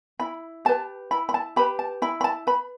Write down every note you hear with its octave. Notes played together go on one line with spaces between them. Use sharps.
E4 B5
G4 B4 A5
E4 B5
B5
A5
G4 B4 B5
A5
E4 B5
B5
A5
B4 B5